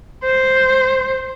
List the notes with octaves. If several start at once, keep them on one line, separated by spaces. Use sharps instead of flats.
C5